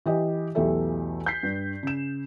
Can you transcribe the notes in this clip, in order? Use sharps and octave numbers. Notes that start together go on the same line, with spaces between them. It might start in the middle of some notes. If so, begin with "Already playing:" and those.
E3 G4 D#5
B1 E2 A3 G4 A4 E5
G6 B6 C7
G2
C#3 E7